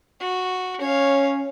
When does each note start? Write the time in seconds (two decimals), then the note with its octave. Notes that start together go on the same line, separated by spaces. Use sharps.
0.20 F#4
0.81 C#4 C#5 F5